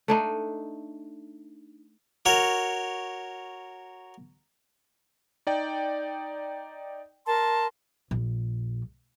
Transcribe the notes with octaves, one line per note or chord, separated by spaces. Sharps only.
A3 D4 D#4
F#4 A#4 C#5
D#4 D5 G5
A#4 A5 C6
A#1